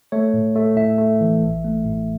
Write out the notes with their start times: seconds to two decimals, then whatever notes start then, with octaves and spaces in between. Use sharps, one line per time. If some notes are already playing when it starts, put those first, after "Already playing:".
0.12 A3 C#5
0.34 A2
0.56 A3
0.77 A2 E5
0.98 A3
1.21 E3
1.42 A1
1.64 A3
1.85 A2